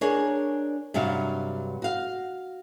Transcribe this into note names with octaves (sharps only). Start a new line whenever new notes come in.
D4 G#4 A#4 C#5
G2 C3 F#3 F5
F#4 F5